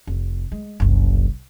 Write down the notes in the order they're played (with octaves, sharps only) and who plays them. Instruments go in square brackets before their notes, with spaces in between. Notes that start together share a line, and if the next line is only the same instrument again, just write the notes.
[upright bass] F1
G#3
F#1 C2